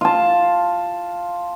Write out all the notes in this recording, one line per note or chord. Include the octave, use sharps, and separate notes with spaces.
F4 A5